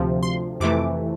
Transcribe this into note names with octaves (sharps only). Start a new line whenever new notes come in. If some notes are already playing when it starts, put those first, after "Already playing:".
Already playing: D2 C3 F3
C6
F2 C3 E3 A3 D6